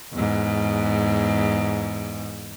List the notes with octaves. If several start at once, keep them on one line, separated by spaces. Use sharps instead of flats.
E2 G#2